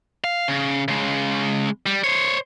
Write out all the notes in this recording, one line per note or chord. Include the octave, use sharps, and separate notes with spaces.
F5
C#3
C#3 G#3
G3
C5 C#5